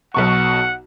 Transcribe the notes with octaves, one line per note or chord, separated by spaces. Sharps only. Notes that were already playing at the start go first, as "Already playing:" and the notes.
B1 B2 F#5 C#6